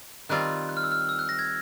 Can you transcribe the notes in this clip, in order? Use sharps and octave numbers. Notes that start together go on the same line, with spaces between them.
D#3 G3 C4 F4 F#6
F#6
F6
E6
F6
E6
F#6
A#6
G#6